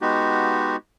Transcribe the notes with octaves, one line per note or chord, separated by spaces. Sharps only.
G#3 B3 D#4 F#4 G4